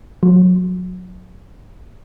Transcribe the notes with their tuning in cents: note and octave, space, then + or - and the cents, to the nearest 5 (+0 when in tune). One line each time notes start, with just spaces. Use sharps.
F#3 -25